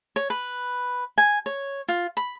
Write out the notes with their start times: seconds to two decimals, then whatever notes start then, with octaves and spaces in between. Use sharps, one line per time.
0.16 C#5
0.30 B4
1.18 G#5
1.46 C#5
1.88 F4
2.17 B5